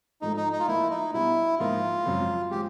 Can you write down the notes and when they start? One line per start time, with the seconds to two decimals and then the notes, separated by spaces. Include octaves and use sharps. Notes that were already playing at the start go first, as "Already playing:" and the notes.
0.22 G#2 F3 A3 D#4
0.37 D#4
0.53 D#4
0.60 F4
0.67 A2 F3 A#3 E4
0.90 D#4
1.13 B2 G3 B3 D4 E4
1.59 G#2 F3 A#3 D#4 F4
2.05 F#2 C#3 F3 G#3 C4
2.51 F3 G#3 G4